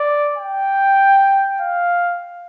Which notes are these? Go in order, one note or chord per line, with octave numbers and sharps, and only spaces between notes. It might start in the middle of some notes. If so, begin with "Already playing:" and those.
Already playing: D5
G5
F5